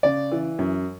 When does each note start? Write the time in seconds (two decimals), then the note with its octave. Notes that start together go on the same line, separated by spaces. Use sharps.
0.03 C#3 D5
0.31 E3
0.59 F#2